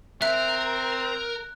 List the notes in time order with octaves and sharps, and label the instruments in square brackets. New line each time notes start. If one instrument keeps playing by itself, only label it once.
[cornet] C4 [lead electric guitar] A#4 [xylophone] E5 [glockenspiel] F#6